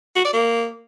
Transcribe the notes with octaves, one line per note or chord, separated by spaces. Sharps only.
F#4
D5
A#3